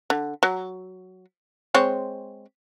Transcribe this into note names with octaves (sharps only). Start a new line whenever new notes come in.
D3
F#3
G#3 C4 C#5